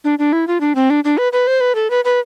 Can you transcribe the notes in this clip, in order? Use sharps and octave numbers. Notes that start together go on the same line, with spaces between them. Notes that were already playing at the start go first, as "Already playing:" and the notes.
D4
D4
E4
F4
D4
C4
D4
D4
B4
B4
C5
B4
A4
B4
B4